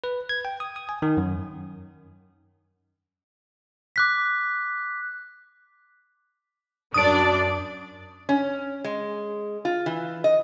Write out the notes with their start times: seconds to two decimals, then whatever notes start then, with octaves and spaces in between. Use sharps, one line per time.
0.04 B4
0.29 G#6
0.45 G5
0.60 D#6
0.76 D#6
0.89 G#5
1.02 D#3
1.17 F#2
3.96 D6 F#6 B6
6.94 F#2 D4 D5 D#6 D7
8.29 C#4
8.84 G#3
9.65 F4
9.86 E3
10.24 D#5